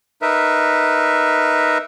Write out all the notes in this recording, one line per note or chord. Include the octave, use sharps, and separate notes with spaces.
D#4 A#4 B4 E5